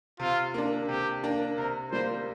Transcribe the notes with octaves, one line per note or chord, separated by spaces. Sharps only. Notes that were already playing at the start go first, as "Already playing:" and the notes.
C3 F4
A#3 D4
C3 G4
A#3 D4
C3 A#4
G3 A#3 C5